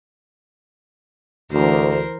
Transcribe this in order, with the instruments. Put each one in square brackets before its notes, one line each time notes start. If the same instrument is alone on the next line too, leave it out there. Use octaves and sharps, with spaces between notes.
[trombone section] D2 [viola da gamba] E3 A#4 C5